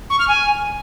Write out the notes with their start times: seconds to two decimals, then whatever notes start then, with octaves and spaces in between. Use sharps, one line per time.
0.10 C#6
0.19 F6
0.28 G#5